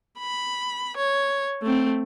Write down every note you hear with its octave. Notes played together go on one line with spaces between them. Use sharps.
B5
C#5
A3 C4